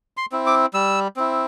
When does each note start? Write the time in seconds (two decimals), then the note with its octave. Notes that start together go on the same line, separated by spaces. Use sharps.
0.17 C6
0.32 C4 E4
0.47 D6
0.74 G3 E6
1.16 C4 E4